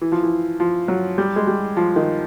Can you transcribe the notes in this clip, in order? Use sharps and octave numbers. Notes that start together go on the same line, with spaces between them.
E3
F3
E3
F3
F#3
G3
G#3
G3
F3
D#3